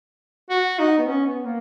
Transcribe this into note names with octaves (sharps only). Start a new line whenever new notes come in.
F#4
D#4
B3
C#4
B3
A#3